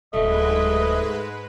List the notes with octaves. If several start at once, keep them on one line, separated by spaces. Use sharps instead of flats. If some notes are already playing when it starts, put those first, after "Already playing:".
D1 G#2 G#3 A3 B4 D#5